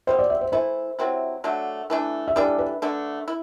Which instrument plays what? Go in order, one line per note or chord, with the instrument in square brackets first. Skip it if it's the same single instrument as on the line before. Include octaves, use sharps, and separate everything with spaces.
[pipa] B2 G3 C4 [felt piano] C5
[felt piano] D5
E5
C5
[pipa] E3 A3 E4 [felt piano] C5
[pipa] C3 F#3 C4 E4
D3 F#3 A3 D4
E3 A3 D4
[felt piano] E5
[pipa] E3 G3 D4 A4 [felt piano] D5
[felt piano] B4
[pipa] D3 A3 D4
E4